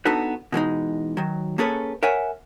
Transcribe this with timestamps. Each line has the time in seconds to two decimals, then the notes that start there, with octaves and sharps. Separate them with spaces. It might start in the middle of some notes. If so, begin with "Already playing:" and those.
0.05 B3 D4 D#4 F#4 A4 B4
0.52 B2 E3 G#3 D#4
1.17 D#3 F#3
1.58 A#3 C#4 G#4 A4 B4 C#5
2.03 A#4 C#5 E5 F#5 G#5